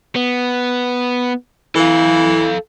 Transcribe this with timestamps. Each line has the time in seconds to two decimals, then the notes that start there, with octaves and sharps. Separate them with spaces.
0.16 B3
1.75 E3 A4 F5